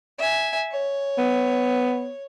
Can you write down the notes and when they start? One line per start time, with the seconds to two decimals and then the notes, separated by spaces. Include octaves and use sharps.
0.18 E5 G#5
0.71 C#5
1.18 B3